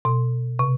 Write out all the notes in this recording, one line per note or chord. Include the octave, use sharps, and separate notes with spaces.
B2
C3